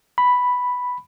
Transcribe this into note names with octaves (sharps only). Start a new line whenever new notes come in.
B5